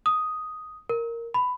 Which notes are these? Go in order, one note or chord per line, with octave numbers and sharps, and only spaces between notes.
D#6
A#4
B5